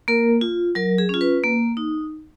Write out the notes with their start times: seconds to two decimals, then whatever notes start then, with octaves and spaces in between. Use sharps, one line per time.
0.08 A#3 A#4
0.41 F4
0.75 F#3 A#4
0.98 G#4
1.09 C#4 F4
1.21 B4
1.43 A#3
1.77 D#4